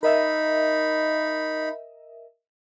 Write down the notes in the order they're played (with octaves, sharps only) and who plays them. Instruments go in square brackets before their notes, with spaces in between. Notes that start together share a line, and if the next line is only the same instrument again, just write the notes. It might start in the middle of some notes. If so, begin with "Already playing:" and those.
[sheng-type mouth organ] D#4 B5 [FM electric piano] A#4 D#5 E5